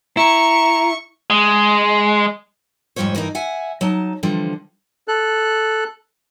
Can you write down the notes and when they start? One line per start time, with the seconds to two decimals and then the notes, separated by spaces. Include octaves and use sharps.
0.17 E4 A#5 C#6
1.30 G#3
2.96 F2 G#2 G3 F4 C5 C#5
3.15 G2 E3 A#3 D#4 A#4
3.35 E5 F#5 G#5
3.81 F#3 D#4 A5
4.23 D3 E3 F3 G3 F4
5.08 A4 F#6